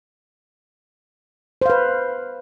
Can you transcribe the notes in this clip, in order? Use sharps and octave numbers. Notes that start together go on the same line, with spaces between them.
B4 C5 F5